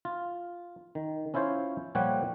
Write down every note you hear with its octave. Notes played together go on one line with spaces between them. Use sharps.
F4
D#3
C#4 E4 F4 C5 C#5
A#2 F3 G3 G4 C#5 F#5